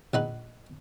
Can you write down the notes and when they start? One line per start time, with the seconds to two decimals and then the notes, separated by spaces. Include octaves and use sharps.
0.14 A#1 D#4 B4